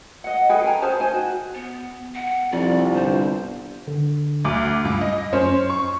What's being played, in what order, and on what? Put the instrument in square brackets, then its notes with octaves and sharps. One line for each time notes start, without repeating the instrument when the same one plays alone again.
[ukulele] D#5 F#5
G#4 A4 B4 G5
C#4 G#5 A#5
C#4 G#4 C5 A5
D#4 C5 G#5
F#4
[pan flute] B3
F#5
[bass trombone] C2 [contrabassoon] F2 [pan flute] D5
[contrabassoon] G1 [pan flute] C5
[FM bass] D3
[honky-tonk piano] D2 D6
[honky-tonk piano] C#2 [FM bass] G2
[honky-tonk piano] D#5
[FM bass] F#2 [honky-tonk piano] C#4 C5
[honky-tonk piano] C#6